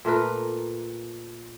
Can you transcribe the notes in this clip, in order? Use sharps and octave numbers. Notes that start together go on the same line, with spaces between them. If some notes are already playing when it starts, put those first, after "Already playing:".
A#2 A3 A#4 B4